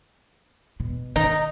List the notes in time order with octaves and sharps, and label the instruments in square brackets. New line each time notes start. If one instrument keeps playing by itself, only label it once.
[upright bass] B2
[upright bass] D#3 [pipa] D#4